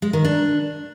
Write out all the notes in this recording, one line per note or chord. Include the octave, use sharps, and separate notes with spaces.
G#3
D#3
D4